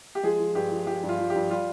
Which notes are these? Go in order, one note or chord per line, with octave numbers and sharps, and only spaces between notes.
G4
F3 G#3 G#4
F3
G2 G4
F3
F3 G4
G2
F4
F3
G4
G2
G3 F4